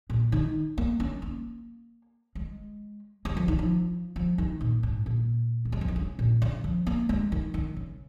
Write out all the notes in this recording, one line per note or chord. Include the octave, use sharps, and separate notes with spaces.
A#2
D#3
A#3
C#4
A#3
G#3
G#3
F3
D#3
F3
F3
D#3
A#2
G#2
A#2
A#3
G#3
F3
D#3
C#3
A#2
C#3
F3
A#3
G#3
D#3
D#3
C#3